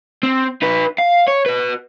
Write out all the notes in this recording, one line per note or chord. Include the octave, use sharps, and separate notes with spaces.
C4
D#4 B4
F5
C#5
F#4 B4